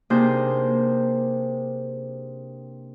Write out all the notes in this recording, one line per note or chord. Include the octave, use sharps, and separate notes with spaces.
C3 A#3 D4 D#4 G#4 C5